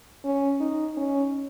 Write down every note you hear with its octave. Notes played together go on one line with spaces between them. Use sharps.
C#4
D#4
C#4